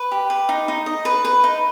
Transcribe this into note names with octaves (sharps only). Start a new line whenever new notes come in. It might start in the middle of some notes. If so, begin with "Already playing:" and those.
Already playing: B4
G4
B4
D#4
D#4
D#5
B4
B4
D#4